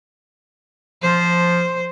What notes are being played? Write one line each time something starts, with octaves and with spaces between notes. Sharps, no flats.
F3 C5